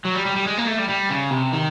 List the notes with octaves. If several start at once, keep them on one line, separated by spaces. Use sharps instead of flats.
F#3
G3
G3
G3
G#3
A#3
A3
G3
G3
C#3
C3
D#3